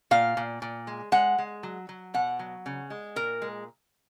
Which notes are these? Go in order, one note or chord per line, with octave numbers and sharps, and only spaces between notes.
A#2 F5
A#2
A#2
G#3
G#3 F#5
G#3
F#3
F#3
B2 F#5
F#3
C#3
G#3
A#2 A#4
G#3